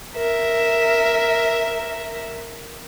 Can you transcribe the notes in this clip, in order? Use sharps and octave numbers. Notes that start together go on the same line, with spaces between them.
A#4 E5